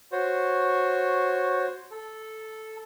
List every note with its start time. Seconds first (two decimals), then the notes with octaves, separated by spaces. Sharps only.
0.12 F#4 C5 C#5
1.91 A4